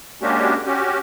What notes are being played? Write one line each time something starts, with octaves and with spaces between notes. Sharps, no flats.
G#3 A#3 C#4 D4 F#4 G4
C#4 F#4 G4